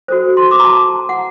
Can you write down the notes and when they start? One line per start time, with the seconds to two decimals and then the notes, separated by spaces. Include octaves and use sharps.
0.08 F#4 A4 C5
0.37 C6
0.51 D6
0.60 A#5
0.65 A5
1.09 F#5